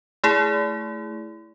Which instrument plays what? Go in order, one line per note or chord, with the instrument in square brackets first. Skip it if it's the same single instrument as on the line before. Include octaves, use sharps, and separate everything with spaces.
[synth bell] A3 E4 G#4